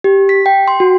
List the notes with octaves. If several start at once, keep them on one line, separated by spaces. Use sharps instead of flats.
G4
B6
G5
C6
F#4